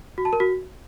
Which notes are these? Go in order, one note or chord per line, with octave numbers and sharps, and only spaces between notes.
F#4
A5
A#4
F#4